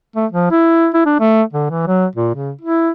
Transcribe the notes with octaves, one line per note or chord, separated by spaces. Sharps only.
A3
F3
E4
E4
D4
A3
D3
E3
F#3
A#2
C#3
E4